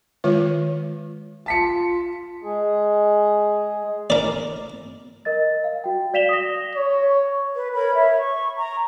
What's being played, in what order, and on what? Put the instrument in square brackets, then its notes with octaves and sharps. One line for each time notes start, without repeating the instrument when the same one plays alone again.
[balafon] D#3 G#3 F4 C#5
[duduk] F4 [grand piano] A5 B6 C#7
[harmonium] G#3 G#4
[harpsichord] A#4 D5
[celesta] A#4 D#5 A6
F5
F#4 G5
D5 F5 B6 E7 F7 G7
D#6 A#6
[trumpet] C#5
[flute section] B4
A#4 C#5 B5
C#5 E5
C#6
A#5